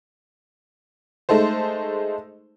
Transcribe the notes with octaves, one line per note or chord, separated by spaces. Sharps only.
G#3 A3 D#4 A4 C5